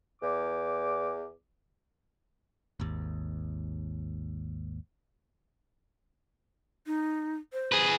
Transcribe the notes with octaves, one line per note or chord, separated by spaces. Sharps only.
E2 D6
G#1 D#2
D#4
C5
G#4 B4